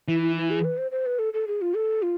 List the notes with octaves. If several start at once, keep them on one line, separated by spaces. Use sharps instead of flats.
E3 E4
E4
E4
G#4
B4
C5
C5
B4
A4
A4
G#4
F4
A4
F4